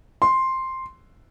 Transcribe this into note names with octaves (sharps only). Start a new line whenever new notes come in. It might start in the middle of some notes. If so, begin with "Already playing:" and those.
C6